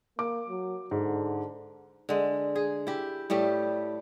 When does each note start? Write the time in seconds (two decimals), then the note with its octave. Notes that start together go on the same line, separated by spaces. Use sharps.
0.19 A#3 D6
0.49 F#3
0.91 G#2 D3
2.09 D3 G#3
2.55 G#4
2.87 E4 G4
3.30 A2 G3 A3 G4